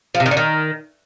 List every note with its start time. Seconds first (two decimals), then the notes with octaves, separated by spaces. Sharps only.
0.15 F3
0.20 C3
0.26 D#3
0.31 D3
0.37 D#3